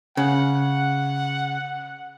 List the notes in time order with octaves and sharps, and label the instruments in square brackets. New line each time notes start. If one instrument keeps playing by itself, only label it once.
[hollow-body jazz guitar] C#3 [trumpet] F#5